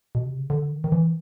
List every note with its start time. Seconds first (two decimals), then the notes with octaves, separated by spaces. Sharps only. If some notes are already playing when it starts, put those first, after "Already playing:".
0.15 B2
0.27 C3
0.38 C#3
0.50 D3
0.72 D#3
0.84 D#3
0.92 E3